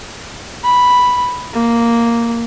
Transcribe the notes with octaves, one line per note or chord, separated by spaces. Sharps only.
B5
A#3